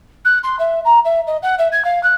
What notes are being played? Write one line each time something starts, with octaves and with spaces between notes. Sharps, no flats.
F#6
C6
E5
A#5
E5
D#5
F#5
E5
G#6
F5
F#6